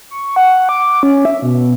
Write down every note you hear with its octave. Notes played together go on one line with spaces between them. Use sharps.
C#6
F#5
D6
C#4
E5
B2